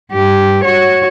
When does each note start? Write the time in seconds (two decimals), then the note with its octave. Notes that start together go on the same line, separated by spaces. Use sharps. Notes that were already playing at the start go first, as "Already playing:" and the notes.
0.12 G2 G4
0.64 F#4 C#5